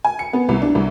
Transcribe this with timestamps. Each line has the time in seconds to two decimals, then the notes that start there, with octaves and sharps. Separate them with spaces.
0.04 G#5
0.19 C#7
0.33 B3
0.49 C2
0.62 D4
0.75 C2